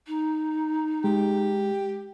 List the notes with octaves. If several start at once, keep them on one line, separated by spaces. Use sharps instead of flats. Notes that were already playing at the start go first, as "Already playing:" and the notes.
D#4
G#3 G4